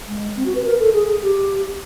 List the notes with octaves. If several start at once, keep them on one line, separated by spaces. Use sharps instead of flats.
G#3
C4
F#4
B4
A#4
A4
G#4
G#4
G4